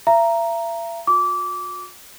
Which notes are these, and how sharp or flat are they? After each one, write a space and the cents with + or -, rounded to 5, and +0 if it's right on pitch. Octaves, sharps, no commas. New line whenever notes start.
E5 +40 A#5 +0
F#4 -45 D6 -20